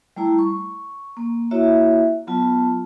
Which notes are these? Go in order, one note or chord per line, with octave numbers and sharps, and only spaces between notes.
G3 A3 E4 A#5
C#6
A#3
A#3 E4 F#4 C#5 E5
F#3 B3 F4 A5